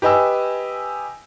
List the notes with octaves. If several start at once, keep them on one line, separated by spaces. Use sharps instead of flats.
G4 B4 D#5 G#5 E6